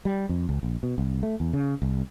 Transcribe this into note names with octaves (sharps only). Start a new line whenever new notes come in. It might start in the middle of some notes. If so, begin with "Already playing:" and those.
G3
F2
C#2
A#1
B2
C2
A3
E2
C#3
C2